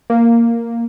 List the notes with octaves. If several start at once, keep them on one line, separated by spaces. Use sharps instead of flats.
A#3